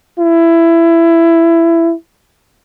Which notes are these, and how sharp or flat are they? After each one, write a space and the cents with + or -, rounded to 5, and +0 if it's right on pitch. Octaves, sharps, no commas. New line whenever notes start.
E4 +15